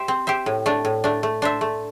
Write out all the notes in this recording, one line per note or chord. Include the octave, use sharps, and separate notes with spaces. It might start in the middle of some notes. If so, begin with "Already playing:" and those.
Already playing: G4 C5 E5
C4
G4 C5 E5
A2
A3 D4
A2
A3 D4
A3
D4 C5 E5
A3